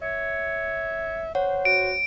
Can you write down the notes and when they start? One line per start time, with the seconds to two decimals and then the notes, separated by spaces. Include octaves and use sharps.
0.02 C#5 E5
1.35 C5 C#5 F#5
1.65 F#4 D7